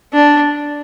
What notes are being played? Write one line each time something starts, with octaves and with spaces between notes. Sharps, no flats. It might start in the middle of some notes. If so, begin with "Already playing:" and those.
D4